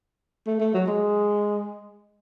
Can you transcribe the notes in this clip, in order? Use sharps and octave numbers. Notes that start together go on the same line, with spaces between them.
A3
A3
F#3
G#3